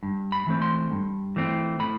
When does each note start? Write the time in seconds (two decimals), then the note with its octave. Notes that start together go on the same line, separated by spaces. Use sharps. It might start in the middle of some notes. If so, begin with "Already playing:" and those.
0.03 G2
0.32 B5
0.47 E3 A3 C4
0.62 C6
0.91 G2
1.36 E3 A3 C4
1.80 A2 B5